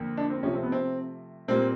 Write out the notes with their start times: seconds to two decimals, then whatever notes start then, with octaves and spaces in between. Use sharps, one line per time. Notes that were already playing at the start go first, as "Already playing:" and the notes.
Already playing: F2 D3 A#3
0.17 D4
0.30 C4
0.43 C3 F3 A3 C#4
0.53 C4
0.63 B3
0.72 C4
1.48 A#2 G3 A#3 C4